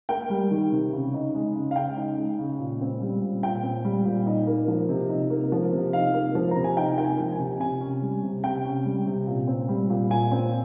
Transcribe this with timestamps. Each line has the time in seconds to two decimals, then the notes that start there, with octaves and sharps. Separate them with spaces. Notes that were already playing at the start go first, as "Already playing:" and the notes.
0.09 A#3 G5
0.30 G3
0.51 D#3
0.72 C3
0.93 C#3
1.14 D#4
1.35 G#3
1.55 C#3
1.71 F5
1.76 C#3 G5
1.97 D#4
2.18 G#3
2.39 C#3
2.59 A#2
2.81 C4
3.01 G3
3.22 A#2
3.43 A#2 G5
3.63 C4
3.85 G3
4.05 A#2
4.27 D#4
4.47 A#3
4.68 F3
4.89 C3
5.09 D#4
5.30 A#3
5.52 F3
5.73 C3
5.93 D#4 F5
6.14 A#3
6.35 F3
6.51 A#5
6.56 C3
6.64 G#5
6.77 D#4 G5
6.98 A#3 G5
7.04 G#5
7.19 F3
7.32 G#5
7.39 C3
7.60 C3 G#5
7.81 C#4
8.02 G3
8.23 C3
8.44 C3 G5
8.65 C#4
8.85 G3
9.06 C3
9.27 A#2
9.47 C4
9.68 G3
9.90 A#2
10.10 A#2 G#5
10.32 C4